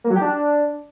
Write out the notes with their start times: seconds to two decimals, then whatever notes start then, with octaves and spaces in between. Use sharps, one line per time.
0.04 A#3
0.10 F#3
0.16 G4
0.22 D4